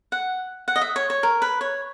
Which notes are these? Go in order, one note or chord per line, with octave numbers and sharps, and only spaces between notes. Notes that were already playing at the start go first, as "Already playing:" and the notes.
F#5
F#5
D#5
E5
C#5
C#5
A#4
B4
C#5